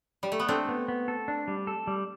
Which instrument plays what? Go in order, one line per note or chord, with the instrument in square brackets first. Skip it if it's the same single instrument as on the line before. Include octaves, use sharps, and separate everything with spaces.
[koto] G3
A3
B3
[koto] A3 C4 [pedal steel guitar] D4
[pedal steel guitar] B3
B3
A4
D4
G3
A4
G3